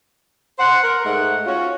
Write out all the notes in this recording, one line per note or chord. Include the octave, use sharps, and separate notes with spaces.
C5 F#5
A#4
G#2 A3 F#5
C#4 F4 F#4